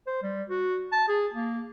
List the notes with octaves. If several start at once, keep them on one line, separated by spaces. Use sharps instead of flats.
C5
G3
F#4
A5
G#4
A#3